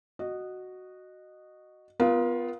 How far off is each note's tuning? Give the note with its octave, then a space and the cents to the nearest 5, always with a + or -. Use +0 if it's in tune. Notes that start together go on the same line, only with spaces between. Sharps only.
F#4 +0 D#5 -15
B3 +20 F4 -5 A#4 +45